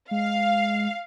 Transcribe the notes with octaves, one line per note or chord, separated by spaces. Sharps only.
G#3 F5